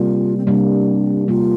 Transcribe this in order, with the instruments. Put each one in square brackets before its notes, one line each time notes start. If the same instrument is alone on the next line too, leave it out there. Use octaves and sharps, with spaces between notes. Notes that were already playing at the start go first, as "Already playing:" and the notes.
Already playing: [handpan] C3 G3 A#3 [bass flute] F4
[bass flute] C4
[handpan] C3 G3 A#3 [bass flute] D4
[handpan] C3 G3 A#3 [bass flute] F4